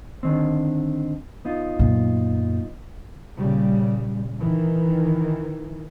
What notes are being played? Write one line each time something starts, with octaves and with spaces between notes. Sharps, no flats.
D3 D#3 C4
B3 D#4 F4
F#2 A#2
A#2 C#3 G3
D#3 E3